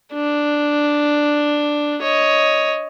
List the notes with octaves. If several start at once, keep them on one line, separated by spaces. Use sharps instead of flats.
D4
C#5 D#5